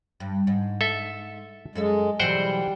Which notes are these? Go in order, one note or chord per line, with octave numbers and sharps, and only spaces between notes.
G2
G#2
A4 E5
F#2 G#3 A4 E5
B2 E3 F#3 G3 C5 F#5 G5